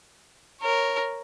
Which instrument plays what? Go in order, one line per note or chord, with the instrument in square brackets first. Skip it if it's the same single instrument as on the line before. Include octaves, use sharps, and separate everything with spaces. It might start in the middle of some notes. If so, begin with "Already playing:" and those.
[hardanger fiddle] A#4 C#5